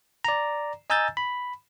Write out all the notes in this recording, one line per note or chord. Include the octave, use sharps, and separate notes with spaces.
D5 A#5
D#5 G#5 A#5 E6 G6 A6
B5